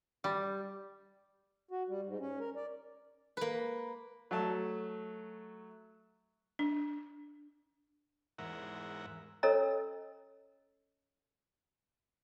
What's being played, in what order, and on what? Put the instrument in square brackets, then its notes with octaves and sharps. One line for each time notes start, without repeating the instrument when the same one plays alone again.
[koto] G3
[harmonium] F#4
G3
G#2
C#4
A#4
D5
[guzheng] A#3 B4
[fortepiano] F#3 A3 A5
[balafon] D4
[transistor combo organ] E2 G#2 A#4 E5 F#5
[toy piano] C#4 A4 C#5 D#5 A#5 E6